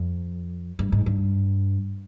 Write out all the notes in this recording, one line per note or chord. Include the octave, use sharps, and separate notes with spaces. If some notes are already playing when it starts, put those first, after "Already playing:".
Already playing: F2
G2
G#2
G2